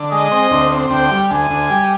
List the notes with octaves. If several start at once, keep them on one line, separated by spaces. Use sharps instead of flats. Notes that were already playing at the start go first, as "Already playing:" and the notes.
Already playing: D3
G#3 D#5
C4
D2
C4
D2 G5
G3
D2 G#5
D2
G3